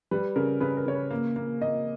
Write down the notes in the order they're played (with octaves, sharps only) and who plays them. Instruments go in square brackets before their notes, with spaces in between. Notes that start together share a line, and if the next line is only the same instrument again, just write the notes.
[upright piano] G3 B4
C#3 A#4
C#3 B4
A#4
C#3 C#5
B4
A#3
A#3
A#3 D#5